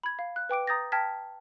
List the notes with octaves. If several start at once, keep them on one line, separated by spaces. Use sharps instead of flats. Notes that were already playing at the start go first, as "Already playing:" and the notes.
B5 G#6
F5
F#6
B4 G5 D6 D7
A#5 D#6 G6 A6 A#6
G5 A5 F6 G#6 A#6 B6